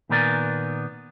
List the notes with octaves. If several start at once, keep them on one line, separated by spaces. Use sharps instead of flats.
A#2 D#3 B3 A#4 D5 G#5